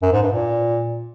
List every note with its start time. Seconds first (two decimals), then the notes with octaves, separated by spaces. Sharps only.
0.02 F#2
0.12 G#2
0.23 G2
0.33 A#2